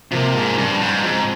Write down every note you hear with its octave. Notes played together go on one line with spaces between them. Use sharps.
C3 F3 A#3
G#2
G2 C#3
G#2
G#2 F3 C4